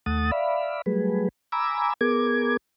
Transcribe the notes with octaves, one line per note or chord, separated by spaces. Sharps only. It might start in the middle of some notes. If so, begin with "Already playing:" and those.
D#2 A3 F#5 D#6 A6
D5 E5 F5 B5
F#3 G3 A3 G#4 B4
G#5 A#5 B5 D6 E6
B3 G#4 A#4 D6 G#6